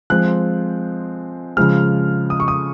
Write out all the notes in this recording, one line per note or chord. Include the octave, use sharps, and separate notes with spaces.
F3 G#3 C4 F#6
C#3 F3 G#3 F6
D#6
C#6
D#6